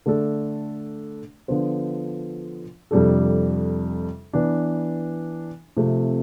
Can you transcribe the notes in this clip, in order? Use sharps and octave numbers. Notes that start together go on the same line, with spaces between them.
D3 A3 D4 A4
D3 F3 B3 F4 C5
F2 C3 G3 D4 A4
E3 B3 D4
C3 F3 A3 C4